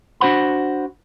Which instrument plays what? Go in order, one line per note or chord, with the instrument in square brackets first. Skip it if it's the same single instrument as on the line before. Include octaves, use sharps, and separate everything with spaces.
[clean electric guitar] D4 F#4 C5 F#5 B5